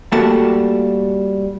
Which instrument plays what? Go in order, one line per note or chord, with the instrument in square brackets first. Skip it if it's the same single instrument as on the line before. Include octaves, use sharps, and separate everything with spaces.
[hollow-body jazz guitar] G3 A3 A#3 F#4 A5